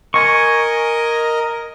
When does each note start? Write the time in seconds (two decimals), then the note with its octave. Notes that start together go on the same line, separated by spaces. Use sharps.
0.14 A#4 D#5 G#5 C#6